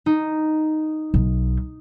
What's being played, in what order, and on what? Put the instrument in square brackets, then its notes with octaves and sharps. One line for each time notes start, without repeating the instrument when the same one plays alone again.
[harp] D#4
[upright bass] B1